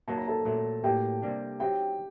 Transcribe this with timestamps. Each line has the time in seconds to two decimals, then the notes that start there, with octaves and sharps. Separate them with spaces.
0.08 F#3 A#3 D#4 A5
0.17 A#5
0.27 A4 A5
0.45 A#2 F#3 A3
0.83 A2 F#3 A#3 G4 G5
1.22 C3 G3 A#3 D4
1.60 F#3 C4 D#4 G4 G5